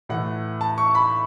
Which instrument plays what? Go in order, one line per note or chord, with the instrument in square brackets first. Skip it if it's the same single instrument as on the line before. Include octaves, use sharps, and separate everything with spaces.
[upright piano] A2 E3 A3 F#5
A5
C#6
B5